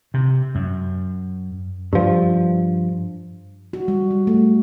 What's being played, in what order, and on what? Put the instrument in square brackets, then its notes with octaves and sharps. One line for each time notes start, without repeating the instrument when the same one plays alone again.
[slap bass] C3
F#2
[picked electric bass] G2 F3
[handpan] F#4
G3
G3
A3